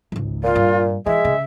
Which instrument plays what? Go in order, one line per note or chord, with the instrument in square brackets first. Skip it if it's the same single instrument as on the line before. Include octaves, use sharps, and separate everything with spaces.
[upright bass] G#1 C#2
[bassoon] A#2 [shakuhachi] F4
[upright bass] G2
[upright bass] E3 [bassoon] G#3 [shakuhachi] E5
[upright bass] C#3